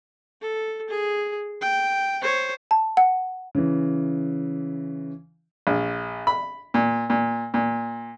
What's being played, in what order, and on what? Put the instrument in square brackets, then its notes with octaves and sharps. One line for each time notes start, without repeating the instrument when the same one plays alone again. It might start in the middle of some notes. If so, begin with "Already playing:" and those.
[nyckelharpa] A4
G#4
G5
C5 C#5
[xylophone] A5
F#5
[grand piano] C#3 E3
[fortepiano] A#1
B5
A#2
A#2
A#2